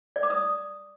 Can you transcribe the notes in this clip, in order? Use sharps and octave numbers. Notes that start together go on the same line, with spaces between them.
D5
D6
D#6